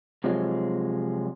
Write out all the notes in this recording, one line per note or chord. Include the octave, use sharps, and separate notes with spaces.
C3 F3 F#3 G#3